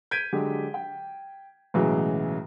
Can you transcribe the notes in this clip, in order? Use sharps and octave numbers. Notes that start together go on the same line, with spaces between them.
G6 G#6 B6 D7 D#7
D3 F#3 G#3 G4
G5
B1 A2 C#3 E3 F#3 G#3